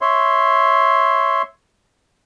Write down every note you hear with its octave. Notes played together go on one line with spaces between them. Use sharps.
C#5 E5 C6